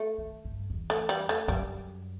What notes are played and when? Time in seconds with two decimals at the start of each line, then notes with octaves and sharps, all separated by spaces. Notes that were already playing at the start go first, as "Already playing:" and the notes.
Already playing: A3
0.18 D#3
0.45 G2
0.70 E2
0.90 A3
1.09 G3
1.29 A3
1.48 F#2 G3